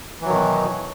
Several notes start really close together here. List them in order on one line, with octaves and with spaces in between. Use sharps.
E3 F#3 D#3 B2